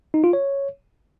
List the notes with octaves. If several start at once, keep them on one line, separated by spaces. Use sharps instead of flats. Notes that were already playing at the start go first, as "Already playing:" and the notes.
D#4
F4
C#5